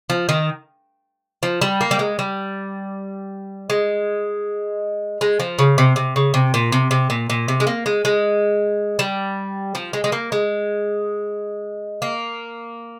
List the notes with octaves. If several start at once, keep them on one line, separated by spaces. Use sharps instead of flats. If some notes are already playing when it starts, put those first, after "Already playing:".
F3
D#3
F3
G3
A#3
G3
G#3
G3
G#3
G#3
F3
C#3
C3
C3
C#3
C3
A#2
C3
C3
A#2
A#2
C3
G#3
A#3
G#3
G#3
G3
F3
G#3
G#3
A#3
G#3
A#3